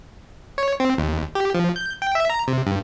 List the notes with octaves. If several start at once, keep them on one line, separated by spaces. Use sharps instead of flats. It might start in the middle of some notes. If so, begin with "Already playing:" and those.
C#5
C4
D#2
G4
F3
G6
G5
E5
A#5
C3
G2